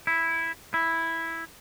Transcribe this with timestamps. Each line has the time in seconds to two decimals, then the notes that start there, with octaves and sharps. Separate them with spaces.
0.07 E4
0.74 E4